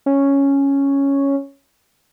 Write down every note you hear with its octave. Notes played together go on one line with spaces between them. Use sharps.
C#4